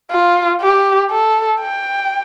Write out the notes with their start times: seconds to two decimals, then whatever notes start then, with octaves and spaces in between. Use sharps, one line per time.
0.11 F4
0.61 G4
1.11 A4
1.61 G5